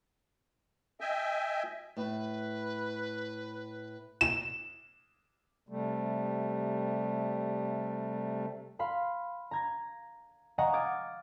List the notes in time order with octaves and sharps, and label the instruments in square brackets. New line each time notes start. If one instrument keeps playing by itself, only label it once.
[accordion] D#5 E5 G5 G#5
[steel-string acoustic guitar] A2 [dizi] B4
[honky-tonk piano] E7
[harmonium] C3 G3 A3
[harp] F5 B5 C6
A#5 G#6 A#6
D#5 F5 F#5 G#5 A#5 C#6
D6 D#6 F6 G#6 A6 D7